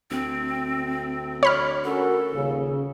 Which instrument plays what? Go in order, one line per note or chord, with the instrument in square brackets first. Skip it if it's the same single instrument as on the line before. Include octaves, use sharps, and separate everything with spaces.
[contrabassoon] D2 [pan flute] C4
[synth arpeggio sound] C#5 B5 F6
[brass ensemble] C#4 F#4 A#4 [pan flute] A4
[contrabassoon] D#1 [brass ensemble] C#3